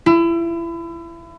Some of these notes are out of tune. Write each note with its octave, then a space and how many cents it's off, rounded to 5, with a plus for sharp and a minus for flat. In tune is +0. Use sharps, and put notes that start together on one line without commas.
E4 +30